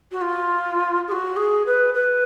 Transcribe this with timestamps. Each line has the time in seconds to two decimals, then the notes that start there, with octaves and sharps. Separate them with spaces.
0.12 F#4
0.21 F4
1.07 G#4
1.12 F#4
1.36 G#4
1.66 B4
1.94 B4